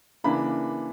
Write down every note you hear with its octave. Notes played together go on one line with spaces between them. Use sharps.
C#3 E3 A#3 D4 B5